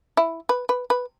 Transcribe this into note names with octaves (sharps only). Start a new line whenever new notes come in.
E4
B4
B4
B4